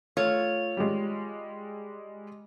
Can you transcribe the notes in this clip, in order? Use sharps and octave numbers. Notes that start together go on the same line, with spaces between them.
A3 F4 C#5
G3 G#3